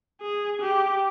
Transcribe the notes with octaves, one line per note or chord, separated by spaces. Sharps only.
G#4
G4